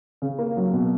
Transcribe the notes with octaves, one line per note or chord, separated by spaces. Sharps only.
C#3
A#3
F#3
B2